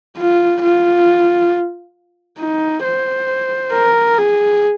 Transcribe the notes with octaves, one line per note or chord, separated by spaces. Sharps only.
F4
F4
D#4
C5
A#4
G#4